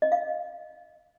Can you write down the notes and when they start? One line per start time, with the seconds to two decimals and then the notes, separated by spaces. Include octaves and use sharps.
0.02 D#5
0.12 F5